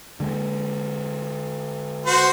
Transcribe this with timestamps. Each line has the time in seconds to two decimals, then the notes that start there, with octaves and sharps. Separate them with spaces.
0.20 D3 G#3
2.06 F#4 C5